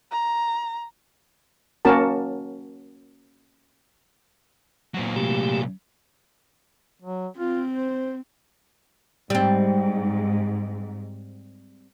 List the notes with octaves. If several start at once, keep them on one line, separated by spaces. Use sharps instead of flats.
A#5
A#3 C#4 F#4 A#4 A5
A#2 F#3 F#4 C5
C3 G#3 A3 G4
F#3
C4 F4
C5
G#2 G3 C4